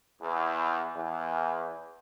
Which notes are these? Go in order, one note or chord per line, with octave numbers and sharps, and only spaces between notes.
E2
E2